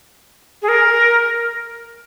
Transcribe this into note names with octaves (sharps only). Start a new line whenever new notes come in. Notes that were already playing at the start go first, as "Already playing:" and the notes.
G#4
A#4